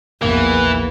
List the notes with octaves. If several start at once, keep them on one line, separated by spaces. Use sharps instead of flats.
A#1 E2 E3 A#3